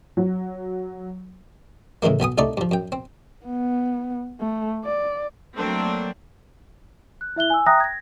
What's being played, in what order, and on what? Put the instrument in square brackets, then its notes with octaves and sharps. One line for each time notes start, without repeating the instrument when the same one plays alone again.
[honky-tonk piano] F#3
[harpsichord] A2 C#3 E3 G#3 A#3
B1 B3 G#5 D#6
C2 A3 D#4 D5 C#6
G2 F3
F#2 G5
C4
[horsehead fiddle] B3
A3
D5
[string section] F#3 A3 A#3 C4 D4
[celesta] F#6
E4 E5 F#6 G7
G#5 E6
E5 G5 A#5 D#6 F#6 A#6
G#6 A#6